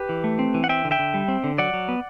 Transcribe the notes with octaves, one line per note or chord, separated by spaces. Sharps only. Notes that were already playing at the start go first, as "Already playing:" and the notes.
Already playing: G4 B4
E3
A3
C4
E3
F#5
C4 E5 G5
D3
E5 G5
D3
G3
C4
D3
F#3 D5 F#5
F#3
B3